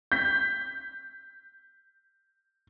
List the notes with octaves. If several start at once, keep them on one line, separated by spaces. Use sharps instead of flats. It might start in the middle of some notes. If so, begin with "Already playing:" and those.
G6 B6